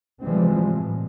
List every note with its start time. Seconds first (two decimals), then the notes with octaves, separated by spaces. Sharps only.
0.22 C3 E3 F3 G3 G#3 C4
0.63 A2